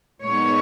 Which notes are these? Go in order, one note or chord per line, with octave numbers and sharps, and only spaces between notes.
A#2 G#3 B3 D#4 C#5